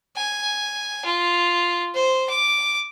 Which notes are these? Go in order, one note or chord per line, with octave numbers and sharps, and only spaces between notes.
G#5
F4
C5
D6